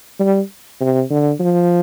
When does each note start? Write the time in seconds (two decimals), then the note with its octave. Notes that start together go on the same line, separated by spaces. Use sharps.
0.19 G3
0.80 C3
1.10 D3
1.40 F3